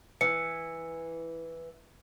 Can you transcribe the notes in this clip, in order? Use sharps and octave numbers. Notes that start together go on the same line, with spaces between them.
E3 C#7